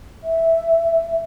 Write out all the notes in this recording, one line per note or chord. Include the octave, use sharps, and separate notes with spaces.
E5